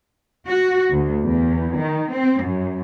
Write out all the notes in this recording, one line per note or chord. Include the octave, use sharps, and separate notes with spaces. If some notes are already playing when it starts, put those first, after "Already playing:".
F#4
D2
E2
D#3
C4
F#2